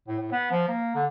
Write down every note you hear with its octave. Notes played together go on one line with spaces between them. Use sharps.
A2
A2
B3
F3
A#3
D3